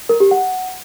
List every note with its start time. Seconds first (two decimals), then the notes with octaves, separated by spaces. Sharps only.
0.09 A#4
0.20 G4
0.31 F#5